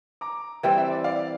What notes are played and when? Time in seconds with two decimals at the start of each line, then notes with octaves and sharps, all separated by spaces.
0.21 A#5 D6
0.63 E3 G3 C4 E5 G5
0.78 E5
0.91 D5
1.04 D5 F5